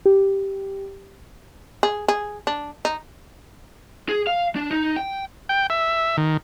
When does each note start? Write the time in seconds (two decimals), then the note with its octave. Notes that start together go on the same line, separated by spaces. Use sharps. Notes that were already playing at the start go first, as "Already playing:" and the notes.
0.05 G4
1.83 G#4
2.08 G#4
2.47 D4
2.85 D#4
4.09 G#4
4.27 F5
4.56 D4
4.71 D#4
4.96 G5
5.49 G5
5.70 E5
6.17 D#3